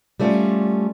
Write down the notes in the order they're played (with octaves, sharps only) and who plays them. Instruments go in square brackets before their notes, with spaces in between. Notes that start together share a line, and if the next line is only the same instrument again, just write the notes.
[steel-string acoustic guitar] G3 A3 C#4 F4